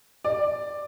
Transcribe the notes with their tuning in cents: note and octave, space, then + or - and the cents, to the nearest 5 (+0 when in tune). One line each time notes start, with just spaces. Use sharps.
D5 +10